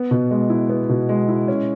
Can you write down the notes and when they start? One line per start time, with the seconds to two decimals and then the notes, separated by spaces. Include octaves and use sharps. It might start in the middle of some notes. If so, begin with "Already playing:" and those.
Already playing: B3
0.11 B2
0.31 G#3
0.50 E4
0.69 B3
0.89 B2
1.09 G#3
1.28 E4
1.48 C#4